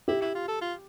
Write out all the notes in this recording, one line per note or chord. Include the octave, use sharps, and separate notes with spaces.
E4 G4
E4
F4
A4
F4